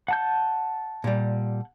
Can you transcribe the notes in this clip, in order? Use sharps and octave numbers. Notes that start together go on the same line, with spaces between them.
F#5 A5 G6
A#2 G3